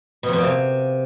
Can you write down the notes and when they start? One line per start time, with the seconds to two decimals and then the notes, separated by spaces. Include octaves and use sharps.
0.23 B2
0.28 F2
0.33 B2
0.38 A#2
0.43 C3